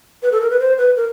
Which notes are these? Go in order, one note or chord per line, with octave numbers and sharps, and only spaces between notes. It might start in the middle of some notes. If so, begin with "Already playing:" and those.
B4
A4
A#4
B4
C5
B4
A#4